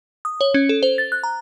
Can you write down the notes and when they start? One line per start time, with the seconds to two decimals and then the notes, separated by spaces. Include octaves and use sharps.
0.25 D#6
0.41 C#5
0.54 C#4
0.69 A4
0.83 C5
0.98 A6
1.12 F#6
1.23 A#5